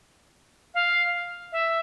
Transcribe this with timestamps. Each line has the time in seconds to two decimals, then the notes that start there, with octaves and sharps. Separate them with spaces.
0.74 F5
1.52 E5